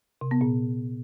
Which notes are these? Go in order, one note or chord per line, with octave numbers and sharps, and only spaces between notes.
C3
B3
A#2